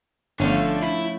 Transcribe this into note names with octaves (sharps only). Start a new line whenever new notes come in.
G1 D3 F3 A3 C#4
E4